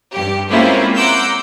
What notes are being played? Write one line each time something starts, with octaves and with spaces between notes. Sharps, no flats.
G2 G4
G#3 A#3 C4 C#4 E4 F4
F#5 A#5 C6 D6 E6 G6